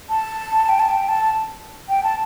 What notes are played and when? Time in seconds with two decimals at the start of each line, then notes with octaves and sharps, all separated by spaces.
0.10 A5
0.69 G5
0.80 A5
0.89 G5
1.09 A5
1.89 G5
2.03 A5